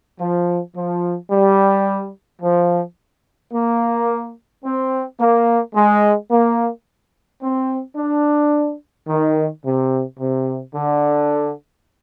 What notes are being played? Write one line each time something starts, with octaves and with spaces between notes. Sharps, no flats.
F3
F3
G3
F3
A#3
C4
A#3
G#3
A#3
C4
D4
D#3
C3
C3
D3